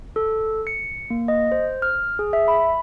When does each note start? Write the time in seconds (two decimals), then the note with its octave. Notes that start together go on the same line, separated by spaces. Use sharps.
0.16 A4
0.67 C#7
1.10 A#3
1.28 D#5
1.52 C5
1.82 F6
2.19 G#4
2.33 E5
2.48 B5